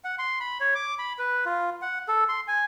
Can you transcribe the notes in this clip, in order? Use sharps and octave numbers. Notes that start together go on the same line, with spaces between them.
F#5
C6
B5
C#5
D6
B5
B4
F4
F#5
A4
C6
G#5